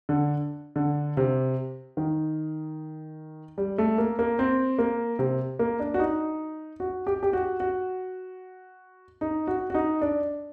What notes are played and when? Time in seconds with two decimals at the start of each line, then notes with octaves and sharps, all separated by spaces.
0.09 D3
0.76 D3
1.17 C3
1.97 D#3
3.58 G3
3.78 A3
3.98 A#3
4.19 A#3
4.39 C4
4.79 A#3
5.19 C3
5.59 A#3
5.80 D4
5.94 F#4
5.99 D#4
6.80 F#4
7.07 G4
7.23 G4
7.33 F#4
7.60 F#4
9.21 D#4
9.47 F#4
9.70 F#4
9.74 D#4
10.02 D4